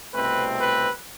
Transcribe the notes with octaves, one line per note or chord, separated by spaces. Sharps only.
C2 B2 A3 C4 B4
B4